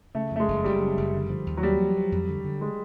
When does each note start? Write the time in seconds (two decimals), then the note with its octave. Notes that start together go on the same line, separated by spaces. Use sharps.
0.15 C#3 A3
0.31 F2 A3
0.40 G#3
0.48 F#1
0.64 F#1 G3
0.81 C#3
0.97 F#1
1.14 D3
1.30 F3
1.46 D#2
1.57 F#3
1.63 G3 A#3
1.79 F3
1.96 F3
2.12 F2
2.29 D3
2.45 D3
2.61 G#3